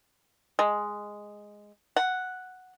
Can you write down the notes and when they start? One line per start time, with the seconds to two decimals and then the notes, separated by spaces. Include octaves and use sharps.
0.59 G#3
1.96 F#5